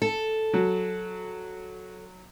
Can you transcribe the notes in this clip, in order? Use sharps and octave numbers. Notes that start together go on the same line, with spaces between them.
A4
F#3